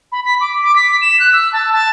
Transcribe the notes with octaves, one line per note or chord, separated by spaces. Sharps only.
B5
B6
D6
D6
B6
E7
F#6
E6
A5
A5